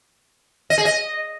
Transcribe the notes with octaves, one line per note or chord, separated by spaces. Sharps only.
D#5
G#4
D#5